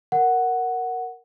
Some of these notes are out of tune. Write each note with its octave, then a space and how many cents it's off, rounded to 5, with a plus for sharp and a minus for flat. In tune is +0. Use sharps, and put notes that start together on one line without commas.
A#4 +0 F#5 +0